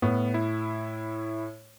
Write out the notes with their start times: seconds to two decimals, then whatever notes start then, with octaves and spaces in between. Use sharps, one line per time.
0.02 A2 B3
0.34 E4